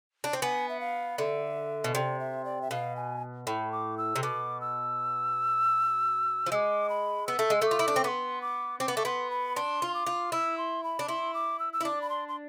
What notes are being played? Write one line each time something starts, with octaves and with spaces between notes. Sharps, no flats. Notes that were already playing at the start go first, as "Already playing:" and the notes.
D4
C4
B3 G#5
E5
F5
D3 E5
B2
C3 D5
E5
D5
E5
B2 F5
G#5
A2 B5
D6
E6
C3
B2 D6
E6
F3
G#3 D6 E6
B5
B3 E6
A3
G#3
A3 D6
F4
E4
D4
C4
B3 C6 D6
D6
C4 D6
B3
A3 D6
B3 C6
B5
D4 C6
F4
D6
F4
E4 E6
C6
B5
D4
E4 C6
D6
E6
E6
E4
D4 D6
B5
C6
C6